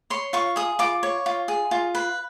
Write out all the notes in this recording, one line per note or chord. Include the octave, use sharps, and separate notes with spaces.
C#5 C6
F4 C#6
G#4 D#6
F4 D6
C#5
F4
G#4
F4
B4